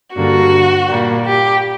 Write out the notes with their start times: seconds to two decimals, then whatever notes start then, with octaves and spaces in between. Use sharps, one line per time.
0.16 G2 D3 G3 A#3 F#4
0.88 A#2 G3 A#3
1.24 G4